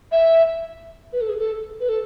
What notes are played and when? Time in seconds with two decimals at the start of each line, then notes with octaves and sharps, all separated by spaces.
0.12 E5
1.13 B4
1.21 A4
1.29 G#4
1.38 A4
1.80 B4
1.89 A4